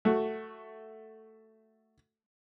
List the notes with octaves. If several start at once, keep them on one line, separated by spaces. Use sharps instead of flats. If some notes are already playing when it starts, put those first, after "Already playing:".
A3 F#4